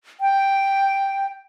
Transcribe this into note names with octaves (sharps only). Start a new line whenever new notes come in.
G5